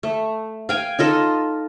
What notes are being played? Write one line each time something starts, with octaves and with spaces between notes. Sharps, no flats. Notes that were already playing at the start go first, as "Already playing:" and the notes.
A3
F5 G5 G#5
D#4 F4 A4 D#5